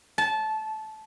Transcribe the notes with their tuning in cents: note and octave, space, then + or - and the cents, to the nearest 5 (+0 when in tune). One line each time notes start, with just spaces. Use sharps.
A5 -20